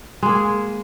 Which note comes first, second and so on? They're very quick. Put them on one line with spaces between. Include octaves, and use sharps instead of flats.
G#3 A#3 G#4